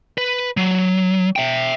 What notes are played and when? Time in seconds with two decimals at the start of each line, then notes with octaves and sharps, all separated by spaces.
0.18 B4
0.57 F#3
1.36 E5 G5